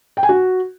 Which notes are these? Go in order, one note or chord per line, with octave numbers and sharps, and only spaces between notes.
G5
G#5
F#4